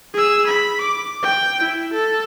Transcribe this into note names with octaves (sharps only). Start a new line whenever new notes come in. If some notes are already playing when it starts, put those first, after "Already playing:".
G#4 E6
B5
D6
G5
E4
A4